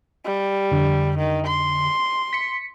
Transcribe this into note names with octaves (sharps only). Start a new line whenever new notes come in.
G3
F2 D3
D#3
C6
B6 C#7